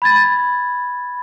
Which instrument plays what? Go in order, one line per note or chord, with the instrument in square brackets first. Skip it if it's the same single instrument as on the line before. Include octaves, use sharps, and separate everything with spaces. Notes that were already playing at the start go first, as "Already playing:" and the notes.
[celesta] B5 G#6 A6